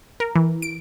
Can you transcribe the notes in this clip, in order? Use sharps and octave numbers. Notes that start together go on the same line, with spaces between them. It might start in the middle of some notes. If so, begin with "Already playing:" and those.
A#4
E3
D7